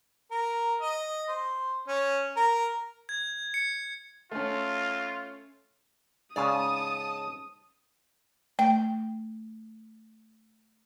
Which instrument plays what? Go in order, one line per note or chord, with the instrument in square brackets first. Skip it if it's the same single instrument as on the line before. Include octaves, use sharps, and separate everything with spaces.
[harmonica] A#4
D#5
C5
C#4
A#4
[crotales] G#6
C#7
[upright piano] A3 C#4 [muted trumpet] F4
[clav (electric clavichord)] G#2 C#3 [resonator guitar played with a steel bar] D5 F5 G#5 [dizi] A5 [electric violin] D#6
[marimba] A3 [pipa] G5